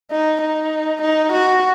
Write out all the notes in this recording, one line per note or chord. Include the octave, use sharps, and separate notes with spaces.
D#4
D#4
D#4
F#4